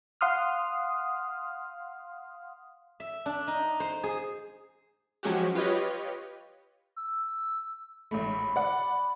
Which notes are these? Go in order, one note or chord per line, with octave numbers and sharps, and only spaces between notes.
F5 F#5 C6 D#6 F6
E5
D4
D#4
C5
G#4
F3 F#3 G#3 C#4 F#4 G4
F4 G4 B4 C#5 D#5
E6
A1 G#2 A3 B5
D5 F#5